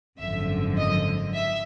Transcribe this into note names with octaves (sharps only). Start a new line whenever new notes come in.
G#1 F#2 D3 F3 E5
D#5
E5